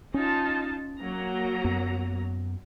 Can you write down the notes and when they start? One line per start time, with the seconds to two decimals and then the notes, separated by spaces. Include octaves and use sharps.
0.14 C#4 D#4 F4 A5
1.00 F#3 A#3 A#5
1.65 F#2 B3